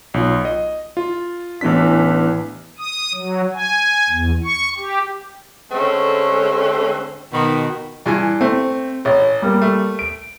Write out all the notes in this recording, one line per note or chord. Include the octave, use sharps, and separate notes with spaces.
B1 F4
D#5
F4
A1 E3 B3 D4 B6
D#6
F#3
G#5
E2
C#6
G4
D3 G#3 A3 C4 C#4
B2 D#3
G2 E3 G#5
A3 C4
A1 C#5
G3 A#3
A3
D7